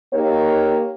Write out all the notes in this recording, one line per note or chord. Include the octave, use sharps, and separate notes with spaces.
A#3 D#4 G4 C#5